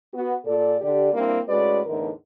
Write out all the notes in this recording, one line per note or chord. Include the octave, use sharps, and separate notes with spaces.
B3 F#4
A#2 A4 D5
D3 G4 D5
G3 A#3 C4 D4 E4
A2 G#3 C#4 F#4 B4 D5
E2 A2 D3 E3 D#4 A#4